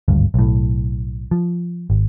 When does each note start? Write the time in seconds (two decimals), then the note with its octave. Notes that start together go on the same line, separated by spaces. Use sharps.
0.08 G#1 D2 G2
0.34 B1 A2
1.31 F3
1.90 G#1